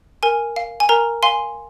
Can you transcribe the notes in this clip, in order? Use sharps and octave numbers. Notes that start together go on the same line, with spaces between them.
A#4 G#5
F5
G#5
A#4 A#5
F5 G#5 C6